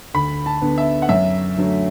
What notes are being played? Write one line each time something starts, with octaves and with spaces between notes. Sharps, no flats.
D2 B5
A5
D3 B3
E5
F#5
F#2 E5
D3 F#3 A3